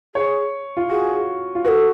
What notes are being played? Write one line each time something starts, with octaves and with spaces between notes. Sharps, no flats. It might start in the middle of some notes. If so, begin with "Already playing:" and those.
G#4 C#5
F4
F#4 G#4
F4
F#4 A4 B4